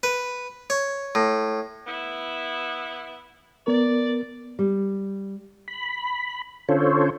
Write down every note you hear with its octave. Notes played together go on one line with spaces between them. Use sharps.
B4
C#5
A2
B3 E4
B3 A#4 D5
G3
B5
D3 C#4 F4 A4 C5 C#5